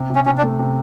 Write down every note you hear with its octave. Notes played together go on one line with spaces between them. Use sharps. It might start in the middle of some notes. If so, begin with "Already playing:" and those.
Already playing: C3
C3
C#4
C3 C#4
D4
A3
C3